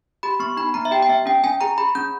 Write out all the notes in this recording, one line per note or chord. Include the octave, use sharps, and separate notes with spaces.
G4 B5
B3 C#6
D#4 B5
B3 A#5
E5
G4 G5
G5
B3 E5
C#4 G5
C#4 G#5
G#4 A#5
G#4 B5
C#4 G6